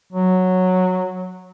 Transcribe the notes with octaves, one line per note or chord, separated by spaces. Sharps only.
F#3